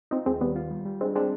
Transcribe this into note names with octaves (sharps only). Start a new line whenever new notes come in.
C4 D#4 F4
D#2 G#3 C4
D#3 G3 B3
F4
G3
G3
G#3 C4 D4
G#3 C4 D4